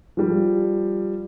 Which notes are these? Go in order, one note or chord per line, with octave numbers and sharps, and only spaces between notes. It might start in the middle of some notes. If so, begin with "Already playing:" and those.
F3 G3